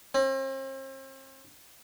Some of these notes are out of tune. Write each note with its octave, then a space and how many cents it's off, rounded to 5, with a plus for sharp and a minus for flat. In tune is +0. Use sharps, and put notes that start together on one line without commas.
C4 +40